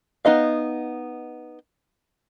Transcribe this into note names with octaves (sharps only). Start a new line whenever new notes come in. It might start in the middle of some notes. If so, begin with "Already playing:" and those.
B3 D#4 D#5 F5